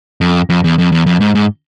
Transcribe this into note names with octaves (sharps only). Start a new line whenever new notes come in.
F2
F2
E2
F2
E2
F2
G#2
G#2